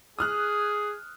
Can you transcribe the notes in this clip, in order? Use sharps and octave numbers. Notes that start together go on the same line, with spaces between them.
G#4 D#6 F6 F#6